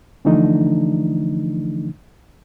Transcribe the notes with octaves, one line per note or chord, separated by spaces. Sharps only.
D3 E3 F3 A3 D4 D#4